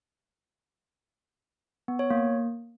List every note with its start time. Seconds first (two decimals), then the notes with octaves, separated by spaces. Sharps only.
1.88 B3
1.99 C#5
2.10 A#3